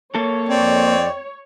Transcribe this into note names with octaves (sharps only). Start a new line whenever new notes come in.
A#3 A4 C#5
F2 C4 D5